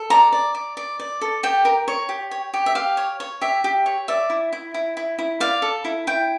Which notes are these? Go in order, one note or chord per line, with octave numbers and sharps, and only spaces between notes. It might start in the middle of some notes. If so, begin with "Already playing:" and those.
Already playing: A4
D5 A#5
D5
D5
D5
D5
A4
G4 G5
A#4
C#5
G4
C#5
G4
E5
G4 F5
C#5
C#5
G4 E5
G4
C#5
D5 E5
E4
E4
E4
E4
E4
D5 F5
A4
E4
E4 G5